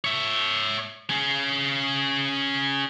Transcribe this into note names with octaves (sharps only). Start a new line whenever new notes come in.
C#5 E5
C#4 G#4